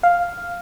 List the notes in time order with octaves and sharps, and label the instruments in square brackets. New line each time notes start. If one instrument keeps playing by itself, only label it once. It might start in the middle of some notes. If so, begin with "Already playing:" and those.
[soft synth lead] F5